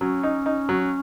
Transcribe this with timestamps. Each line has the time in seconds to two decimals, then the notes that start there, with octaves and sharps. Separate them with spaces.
0.01 F#3 C#4
0.23 D#4
0.46 D#4
0.69 F#3